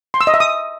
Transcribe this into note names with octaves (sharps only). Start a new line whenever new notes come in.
C6
E6
D#5
E5
D#6